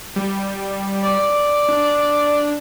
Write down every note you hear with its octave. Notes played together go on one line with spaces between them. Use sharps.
G3
D5
D4